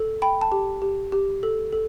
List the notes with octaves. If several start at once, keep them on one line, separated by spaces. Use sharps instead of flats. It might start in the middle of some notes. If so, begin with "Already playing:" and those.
Already playing: A4
G5 B5
A5
G4
G4
G4
A4
A4